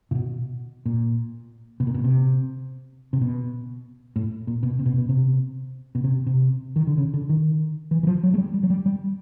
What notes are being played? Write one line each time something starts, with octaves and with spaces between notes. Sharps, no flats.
A#2
B2
A#2
B2
A#2
B2
C3
C3
B2
A2
A#2
B2
C3
B2
B2
C3
B2
C3
C3
D#3
D3
C#3
D3
D#3
E3
E3
F3
F#3
G#3
G3
G3
F#3
G3
G3